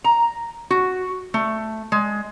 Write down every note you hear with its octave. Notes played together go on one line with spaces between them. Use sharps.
A#5
F#4
A3
G#3